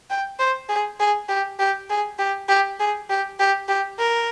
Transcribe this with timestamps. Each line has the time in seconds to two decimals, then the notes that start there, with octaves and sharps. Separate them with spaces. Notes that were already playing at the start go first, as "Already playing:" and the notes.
0.10 G5
0.39 C5
0.69 G#4
1.00 G#4
1.29 G4
1.59 G4
1.90 G#4
2.19 G4
2.49 G4
2.80 G#4
3.10 G4
3.40 G4
3.68 G4
3.99 A#4